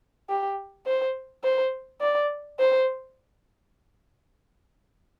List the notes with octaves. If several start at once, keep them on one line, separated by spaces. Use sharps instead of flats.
G4
C5
C5
D5
C5